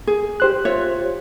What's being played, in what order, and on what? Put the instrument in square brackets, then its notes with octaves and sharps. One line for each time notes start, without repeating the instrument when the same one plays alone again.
[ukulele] G#4
[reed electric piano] G4 C5 F#6
[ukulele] F4 C#5 E5